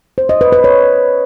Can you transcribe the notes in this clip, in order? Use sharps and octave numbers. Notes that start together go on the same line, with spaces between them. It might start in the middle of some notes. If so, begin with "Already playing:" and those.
C5
D#5
B4
B4
C#5